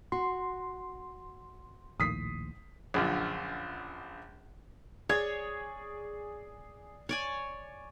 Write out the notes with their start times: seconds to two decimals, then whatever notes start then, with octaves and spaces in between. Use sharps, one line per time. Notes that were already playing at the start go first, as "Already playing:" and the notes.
0.12 F#4 C6
2.00 A#1 D#2 A2 D#6 B6 C7
2.94 A#1 F#2 D3 F4
5.09 G#4 C#5 D5 G#6
7.09 C#5 D5 G#5